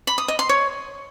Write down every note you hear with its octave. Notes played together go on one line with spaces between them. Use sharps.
B5
D#6
D#5
C6
C#5